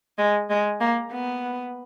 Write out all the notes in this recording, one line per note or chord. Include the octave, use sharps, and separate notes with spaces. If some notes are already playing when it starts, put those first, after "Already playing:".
G#3
G#3
A#3
B3